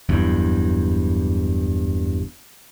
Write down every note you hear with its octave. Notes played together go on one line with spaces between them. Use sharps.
F#1 E2 G2